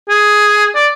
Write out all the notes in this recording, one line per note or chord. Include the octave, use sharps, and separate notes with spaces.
G#4
D5